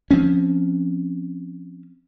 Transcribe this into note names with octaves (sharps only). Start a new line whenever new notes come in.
F3 C4 C#4